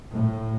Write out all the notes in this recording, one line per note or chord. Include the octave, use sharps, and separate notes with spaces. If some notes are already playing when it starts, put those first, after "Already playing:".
A2